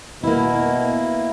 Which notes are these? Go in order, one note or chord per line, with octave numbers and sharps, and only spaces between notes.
B2 A#3 E4